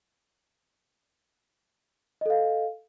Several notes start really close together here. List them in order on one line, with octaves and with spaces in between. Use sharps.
D#5 A4 F5